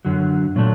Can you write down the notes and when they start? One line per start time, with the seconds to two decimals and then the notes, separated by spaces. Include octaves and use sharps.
0.05 F#2 D3 F#3
0.56 A#2 F#3 A3 D4